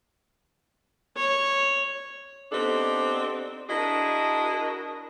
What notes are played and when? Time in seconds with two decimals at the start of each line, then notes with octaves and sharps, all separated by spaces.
1.17 C#5
2.52 B3 C4 D4 D#4 G4 A4
3.69 D4 E4 F#4 G#4 A#4 D#5